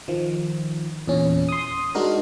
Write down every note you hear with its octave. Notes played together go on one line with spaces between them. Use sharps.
D#3 F3
E2 A#2 C#4
C6 D#6
G#3 D4 D#4 F#4 A#4